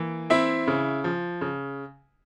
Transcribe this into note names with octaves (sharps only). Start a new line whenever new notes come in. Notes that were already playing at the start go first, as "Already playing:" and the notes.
Already playing: E3 A#3
C4 E4 E5
C#3
F3
C#3